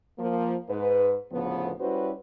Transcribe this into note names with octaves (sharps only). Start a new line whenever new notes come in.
F3 A#3
G#2 B4
D2 A2 C#3 F3 B3
G3 C#4 E4 F#4 B4 C5